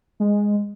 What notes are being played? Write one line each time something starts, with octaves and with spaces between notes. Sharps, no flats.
G#3